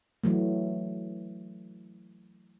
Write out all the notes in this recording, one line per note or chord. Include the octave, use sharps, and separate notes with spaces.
E3 F#3 A3